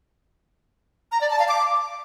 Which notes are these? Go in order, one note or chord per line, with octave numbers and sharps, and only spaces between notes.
A#5
D5
A5
F5
D6